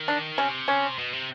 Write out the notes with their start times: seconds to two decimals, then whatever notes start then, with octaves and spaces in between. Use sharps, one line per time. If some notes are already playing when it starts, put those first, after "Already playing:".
Already playing: D#3
0.08 D4
0.38 C3 C#4
0.68 C#4
0.98 B2
1.13 C3